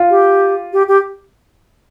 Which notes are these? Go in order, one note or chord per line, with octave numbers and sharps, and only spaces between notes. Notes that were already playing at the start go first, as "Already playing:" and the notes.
Already playing: F4
G4
G4
G4